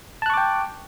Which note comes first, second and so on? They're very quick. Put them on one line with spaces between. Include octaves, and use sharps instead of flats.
A5 F#6 C#6 D6 G5